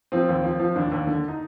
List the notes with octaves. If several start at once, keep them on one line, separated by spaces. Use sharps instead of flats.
F3 C4
D#2
F3
F3
D#2 D4
D#2
D3
D#4